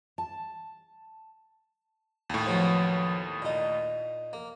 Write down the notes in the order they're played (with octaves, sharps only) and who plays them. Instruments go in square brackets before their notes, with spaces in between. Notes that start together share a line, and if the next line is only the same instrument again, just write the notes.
[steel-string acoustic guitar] A5
[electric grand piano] D#2 A2
[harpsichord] F3 F#3 B3
A#2 D#4
A#3